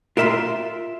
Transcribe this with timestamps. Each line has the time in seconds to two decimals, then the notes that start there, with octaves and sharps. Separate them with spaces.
0.17 F4 A#4 E5 A#5 C6